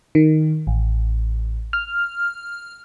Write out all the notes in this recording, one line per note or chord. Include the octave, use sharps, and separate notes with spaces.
D#3
A1
F6